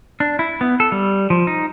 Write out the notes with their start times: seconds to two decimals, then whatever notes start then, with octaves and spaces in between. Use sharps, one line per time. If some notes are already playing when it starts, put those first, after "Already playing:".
0.20 D4
0.39 E4
0.61 B3
0.80 A4
0.92 G3
1.30 F3
1.47 D#4